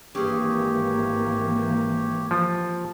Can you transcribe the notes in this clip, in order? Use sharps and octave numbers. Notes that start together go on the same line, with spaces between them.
G#1 G2 E3 A#3 G4 G#4 C#5
F3